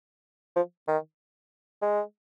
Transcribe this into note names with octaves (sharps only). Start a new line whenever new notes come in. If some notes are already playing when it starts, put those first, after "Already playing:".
F3
D#3
G#3